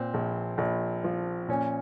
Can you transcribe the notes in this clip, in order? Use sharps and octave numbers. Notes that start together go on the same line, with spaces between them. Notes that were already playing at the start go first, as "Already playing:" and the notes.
Already playing: A#2 C4
A#1
A#1
F3
A#2 C#4